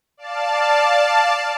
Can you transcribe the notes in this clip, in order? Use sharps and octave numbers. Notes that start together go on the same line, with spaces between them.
D5 F5 A5